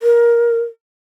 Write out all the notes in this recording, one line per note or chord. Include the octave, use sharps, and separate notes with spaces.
A#4